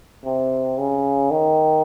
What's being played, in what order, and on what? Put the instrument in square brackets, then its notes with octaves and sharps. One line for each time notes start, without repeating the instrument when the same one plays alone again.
[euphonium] C3
C#3
D#3